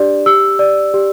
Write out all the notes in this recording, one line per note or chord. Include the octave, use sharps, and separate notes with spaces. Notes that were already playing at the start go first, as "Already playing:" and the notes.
Already playing: D4 G4 D5
G4 E6
D5
G4